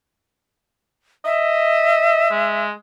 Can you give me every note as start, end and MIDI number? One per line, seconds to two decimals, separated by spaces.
1.25 2.28 75
1.25 2.64 76
2.31 2.71 56